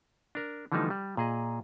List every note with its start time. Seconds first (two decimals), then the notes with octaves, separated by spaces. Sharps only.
0.35 D4 A#4
0.72 D3 E3 F3 G3 A3 D#4
0.90 G3
1.17 A#2 G#4 D#5